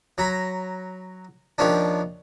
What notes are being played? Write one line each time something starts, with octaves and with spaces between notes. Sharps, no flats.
F#3 A#5 B5
D#2 F3 C#4 D4